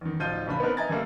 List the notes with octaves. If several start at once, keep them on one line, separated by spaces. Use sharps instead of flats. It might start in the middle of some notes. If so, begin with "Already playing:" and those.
E2 D#3
D1 F3 D#4 F4 G6 D#7
A1 C#3 C#4 D4 B5
B3 C4 D4 D#4 A#4 B4
D#5 E5 G#5 A#5 G#6 A6
D3 G3 A3 A#3